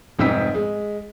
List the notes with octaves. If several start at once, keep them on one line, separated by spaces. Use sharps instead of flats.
F1 G#2 C4 E6 B6
G#3